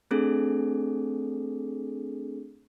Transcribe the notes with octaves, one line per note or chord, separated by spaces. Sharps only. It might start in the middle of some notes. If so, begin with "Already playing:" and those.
A3 C4 D4 G#4 A4